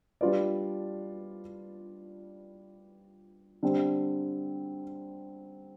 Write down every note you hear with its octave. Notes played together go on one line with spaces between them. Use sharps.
G3 D4 F4 B4 D5
D3 G3 C4